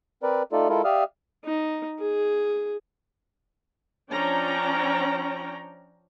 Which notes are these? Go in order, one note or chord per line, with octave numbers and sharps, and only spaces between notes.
C4 A#4 B4 D5
A3 D#4 F4 A4 D5
G#3 E4 F4 A4 A#4
G4 D5 E5 F5 D#6 F6
D#4
G#4
F3 C#4 D4 C#5 G5 A#5